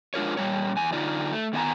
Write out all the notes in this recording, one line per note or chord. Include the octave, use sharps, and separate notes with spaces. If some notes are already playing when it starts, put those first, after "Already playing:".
G#3 D4 F4 A#4 C#5
A#2 G3 C#5
E2 G#5
D3 D#4 F4 D5
A3
D#3 B3 D5 G#5 A#5